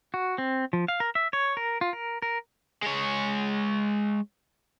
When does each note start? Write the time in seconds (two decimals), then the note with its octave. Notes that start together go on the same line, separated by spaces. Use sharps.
0.14 F#4
0.38 C4
0.73 F3
0.88 F5
1.00 A#4
1.15 E5
1.33 C#5
1.57 A#4
1.81 F4
1.93 A#4
2.22 A#4
2.83 G#3 C#5